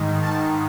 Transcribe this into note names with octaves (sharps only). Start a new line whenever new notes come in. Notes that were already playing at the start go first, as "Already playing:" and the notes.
Already playing: G#2 D#3
A5